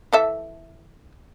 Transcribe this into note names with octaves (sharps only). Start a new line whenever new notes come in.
E3 A4 E5